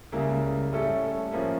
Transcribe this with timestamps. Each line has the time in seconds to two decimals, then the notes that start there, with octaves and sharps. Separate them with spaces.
0.12 C#2 C#3 G3 A#3 E4
0.72 A2 G3 C#4 E4 A4
1.32 A2 F3 A#3 C#4